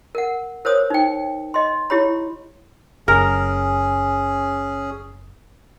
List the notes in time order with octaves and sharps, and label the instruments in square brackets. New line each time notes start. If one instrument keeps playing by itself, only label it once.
[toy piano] A#4 F#5
A#4 C5 C#5 D#6
D#4 G5
D#5 C6
E4 G4 C#5 B5
[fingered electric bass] F#1 [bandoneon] C#4 G#4 [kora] A#4